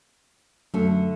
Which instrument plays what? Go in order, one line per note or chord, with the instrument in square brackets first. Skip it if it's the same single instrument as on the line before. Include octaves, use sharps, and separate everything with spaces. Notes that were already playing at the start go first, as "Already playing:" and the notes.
[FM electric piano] F#2 [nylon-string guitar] D3 A3